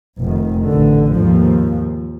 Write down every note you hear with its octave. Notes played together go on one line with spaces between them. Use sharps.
F1 D#3
A1 D3
D#2 G#2 F3